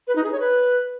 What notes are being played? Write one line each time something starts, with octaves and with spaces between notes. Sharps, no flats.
B4
D#4
G#4
C#5
B4